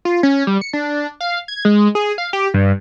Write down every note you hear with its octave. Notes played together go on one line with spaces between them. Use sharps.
F4
C#4
G3
C#7
D4
F5
G#6
G#3
G#4
F5
G4
G2